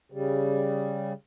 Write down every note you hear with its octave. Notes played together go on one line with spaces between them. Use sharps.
C#3 G3